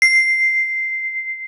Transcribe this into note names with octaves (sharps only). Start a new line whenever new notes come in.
C7